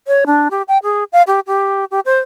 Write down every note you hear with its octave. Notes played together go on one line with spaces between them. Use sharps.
C#5
D4
G4
G5
G#4
F5
G4
G4
G4
C5